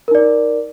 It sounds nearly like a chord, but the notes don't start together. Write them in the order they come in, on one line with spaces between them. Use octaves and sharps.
A#4 D#4 D5